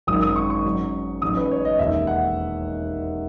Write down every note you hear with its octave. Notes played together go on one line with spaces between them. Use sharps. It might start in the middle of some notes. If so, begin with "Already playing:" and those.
G#1 F#2 D#3 F#3 D#6
D#6
C#6
C#6
G#2 F#3 C#4
A1 G#2 F#3 A3 C#4 D#6
B4
C#5
D#5
E1 D#2 D#3 E5
F#5